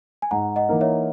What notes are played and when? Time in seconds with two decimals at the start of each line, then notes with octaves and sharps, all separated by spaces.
0.22 G#5
0.31 G#2 F#5 A#5
0.56 D#5 F#5
0.69 E3 A#3 D#4 A#4
0.81 C#5 E5